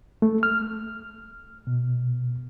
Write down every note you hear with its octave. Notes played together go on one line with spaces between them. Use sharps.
A3
F6
B2